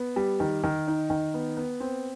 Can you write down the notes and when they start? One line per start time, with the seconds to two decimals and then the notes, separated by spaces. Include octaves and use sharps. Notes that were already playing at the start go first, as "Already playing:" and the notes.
Already playing: B3
0.16 G3
0.40 D#3
0.64 D#3
0.88 D#4
1.10 D#3
1.34 B3
1.57 B3
1.80 C4